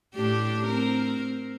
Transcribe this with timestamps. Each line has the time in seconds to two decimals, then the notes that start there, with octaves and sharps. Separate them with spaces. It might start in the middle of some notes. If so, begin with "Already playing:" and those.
0.15 A2 D4 G4
0.66 C4 A#4